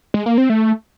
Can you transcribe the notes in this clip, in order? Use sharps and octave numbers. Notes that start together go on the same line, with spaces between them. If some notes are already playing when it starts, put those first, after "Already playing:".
G#3
A#3
C4
A3